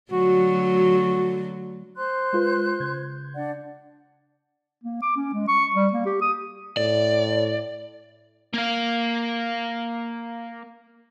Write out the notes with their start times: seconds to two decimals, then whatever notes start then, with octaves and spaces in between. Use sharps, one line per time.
0.11 D3 F#3 A3 F#4
1.97 C5 C6 F#6
2.33 G#3 F4 B4
2.80 C#3 G6 G#6
3.35 D4 D5 F#5
4.84 A#3
5.02 D6
5.16 C#4
5.34 G#3
5.48 C#6
5.76 G3
5.93 A#3
6.06 G4
6.22 D#6
6.77 A2 D5
8.54 A#3 F5